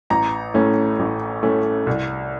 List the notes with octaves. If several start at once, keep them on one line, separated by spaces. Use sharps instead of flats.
A1 A#5
A2 A3 C#4
A1
A2 A3 C#4
C2